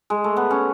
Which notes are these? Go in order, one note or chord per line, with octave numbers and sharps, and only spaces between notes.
G#3
A3
B3
C#4